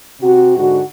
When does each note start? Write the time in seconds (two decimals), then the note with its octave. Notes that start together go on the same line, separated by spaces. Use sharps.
0.21 C3 F#4
0.57 G#2 D3 F#4